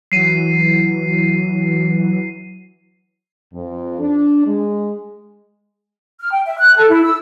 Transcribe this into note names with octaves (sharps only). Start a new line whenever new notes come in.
E3 F#3 C7 D#7
F2
D4
G#3
F6
G5
E5
F#6
A4
E4
E6